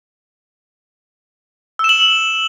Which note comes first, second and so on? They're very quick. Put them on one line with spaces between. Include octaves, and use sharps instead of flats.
E6 E7 F#7